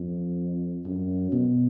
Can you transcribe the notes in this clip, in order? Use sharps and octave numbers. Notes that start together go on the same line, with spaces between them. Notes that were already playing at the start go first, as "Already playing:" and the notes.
Already playing: F2
F#2
B2